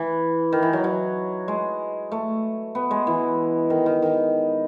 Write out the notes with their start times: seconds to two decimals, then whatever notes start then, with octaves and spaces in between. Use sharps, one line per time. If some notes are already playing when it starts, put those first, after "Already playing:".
Already playing: E3
0.52 D#3
0.63 E3
0.73 F#3
0.84 F#3
1.48 G#3
2.12 A3
2.75 B3
2.91 G#3
3.07 E3
3.70 D#3
3.86 D#3
4.02 D#3